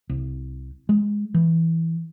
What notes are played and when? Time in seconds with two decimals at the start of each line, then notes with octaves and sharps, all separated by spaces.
0.09 C2
0.89 G#3
1.34 E3